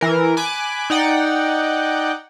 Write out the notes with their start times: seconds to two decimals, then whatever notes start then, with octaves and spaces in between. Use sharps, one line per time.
0.01 E3 A#4
0.37 G#5 B5 D6 F#6
0.90 D#4 D5 F#5 G5